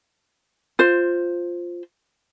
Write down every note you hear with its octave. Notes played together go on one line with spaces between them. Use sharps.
F4 C5